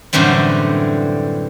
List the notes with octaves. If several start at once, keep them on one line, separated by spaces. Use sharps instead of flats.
F#2 A2 D3 E3 G3 C4